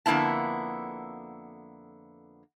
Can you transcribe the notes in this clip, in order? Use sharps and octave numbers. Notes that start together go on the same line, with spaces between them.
F2 D3 A#3 B3 E4 A5